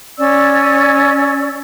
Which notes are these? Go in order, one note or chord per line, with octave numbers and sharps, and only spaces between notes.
C#4 D5 E6